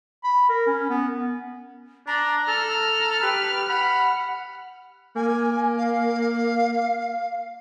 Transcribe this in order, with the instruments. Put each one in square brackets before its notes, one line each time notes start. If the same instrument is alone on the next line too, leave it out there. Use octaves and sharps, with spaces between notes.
[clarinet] B5
A#4
C#4
B3
[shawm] D4 [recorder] A#5
[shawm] A4 [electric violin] F6
[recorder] G4 [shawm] B4
[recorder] F#5 [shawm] B5
[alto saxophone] A#3 [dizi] G#5
[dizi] F5